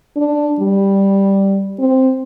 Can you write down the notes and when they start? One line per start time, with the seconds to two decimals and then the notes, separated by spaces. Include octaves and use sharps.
0.17 D4
0.60 G3
1.79 C4